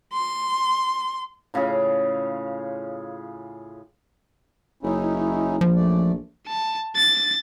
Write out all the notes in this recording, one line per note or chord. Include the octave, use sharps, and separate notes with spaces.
C6
A2 C#3 F4 G#4
F#1 C#4 D#4 E4
A#1 F3
F#2 A3 D5
A5
A6